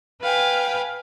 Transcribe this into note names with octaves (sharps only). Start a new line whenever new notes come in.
B4 F5 G5 G#5